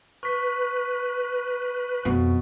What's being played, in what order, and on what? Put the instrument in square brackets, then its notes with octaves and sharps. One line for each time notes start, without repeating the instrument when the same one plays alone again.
[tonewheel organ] B4 [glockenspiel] C#6 B6
[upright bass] F2 [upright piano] B2